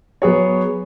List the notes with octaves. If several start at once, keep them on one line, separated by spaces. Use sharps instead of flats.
F#3 B3 G#4 C#5